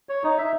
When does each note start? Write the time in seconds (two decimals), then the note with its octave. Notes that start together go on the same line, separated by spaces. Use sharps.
0.09 C#5
0.24 D#4
0.38 E5